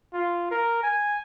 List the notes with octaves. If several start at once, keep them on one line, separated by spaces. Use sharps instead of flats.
F4
A#4
G#5